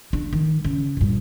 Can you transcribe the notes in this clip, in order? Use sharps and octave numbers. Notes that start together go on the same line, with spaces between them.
D4
D#3
C#3
G2 A#2